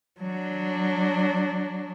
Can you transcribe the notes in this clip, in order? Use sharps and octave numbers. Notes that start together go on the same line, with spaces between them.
F#3 D4